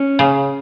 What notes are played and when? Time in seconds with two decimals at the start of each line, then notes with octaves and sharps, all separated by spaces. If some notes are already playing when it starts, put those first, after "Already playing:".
Already playing: C#4
0.19 C#3